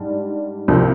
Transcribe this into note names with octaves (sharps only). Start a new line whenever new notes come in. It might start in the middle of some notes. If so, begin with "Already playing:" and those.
Already playing: G#2 G3 D4
C2 C3 F3 C4